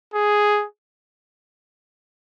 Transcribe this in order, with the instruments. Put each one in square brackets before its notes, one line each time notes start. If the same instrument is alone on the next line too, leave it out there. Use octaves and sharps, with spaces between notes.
[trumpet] G#4